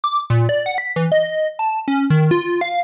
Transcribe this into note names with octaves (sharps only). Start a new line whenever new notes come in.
D6
A#2
D5
F#5
B6
E3
D#5
A5
C#4
D#3
F4
F5